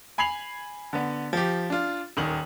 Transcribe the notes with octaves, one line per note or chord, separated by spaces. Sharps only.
G#5 B5 G#6 C7 F7 F#7
D3 B3
F3 G4
D4 F4
D#1 D#3 F#7